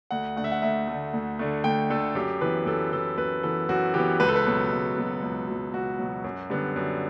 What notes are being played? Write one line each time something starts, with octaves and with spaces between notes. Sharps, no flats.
D2 F#5
D3 A3 F#5
E5
F#5
D2 E5
D3 A3
D2
D3 A3
D2 G5
D3 A3 A4
F#2 G4
E3 B3 B4
F#2 A4
E3 B3 A4
F#2 B4
E3 B3 A4
F#2 F#4
E3 B3 G4
C#2 B4
A4
B4
B2 F#3
C#2
B2 F#3
C#2
B2 F#3
C#2 F#4
B2 F#3
F#2
D3 G3 B3
F#2